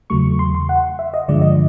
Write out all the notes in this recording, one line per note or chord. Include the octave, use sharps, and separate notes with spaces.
E2 C#3 F#3 A3 C#6
C6
C6
F#5
E5
D#5
G2 D3 F3 G#3 D5
D#5